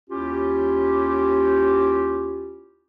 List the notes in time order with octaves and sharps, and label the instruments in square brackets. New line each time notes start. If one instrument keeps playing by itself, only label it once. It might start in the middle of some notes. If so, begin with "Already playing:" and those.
[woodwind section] D#2 C#4 E4 F4 G4